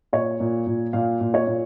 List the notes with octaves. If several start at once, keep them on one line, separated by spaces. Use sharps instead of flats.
A#2 C#5
A#2
A#2
A#2 F5
A#2
C#5
A#2